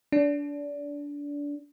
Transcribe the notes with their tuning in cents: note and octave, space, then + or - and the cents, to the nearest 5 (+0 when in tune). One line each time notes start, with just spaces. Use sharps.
D4 -25